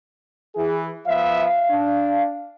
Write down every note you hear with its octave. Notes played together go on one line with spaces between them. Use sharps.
E3 G#4
F3 B3 E5 F5
D4